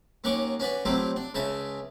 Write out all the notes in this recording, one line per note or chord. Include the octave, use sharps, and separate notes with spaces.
D#2 C#4 F#5 A#5 C#6 D6
C#4 F#4 B4 D5
F#3 A3 C4 E4 F4 G4
D4
C#2 C#3 C#4 E5 A5